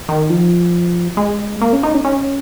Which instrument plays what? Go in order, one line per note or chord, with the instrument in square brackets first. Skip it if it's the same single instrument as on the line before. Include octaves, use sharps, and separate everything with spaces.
[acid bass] D#3
F3
G#3
A#3
C#4
D#4
C#4
C#4